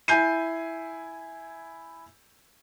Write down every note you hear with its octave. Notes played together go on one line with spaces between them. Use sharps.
E4 G#5 G6 C7 D#7